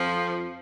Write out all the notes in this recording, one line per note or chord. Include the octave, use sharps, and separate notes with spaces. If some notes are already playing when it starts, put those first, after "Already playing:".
Already playing: F2 F3